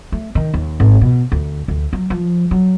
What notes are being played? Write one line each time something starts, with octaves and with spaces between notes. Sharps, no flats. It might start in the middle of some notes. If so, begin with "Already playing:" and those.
A3
D#3
D#2
G#1
B2
D2
D2
F#3
F3
F#3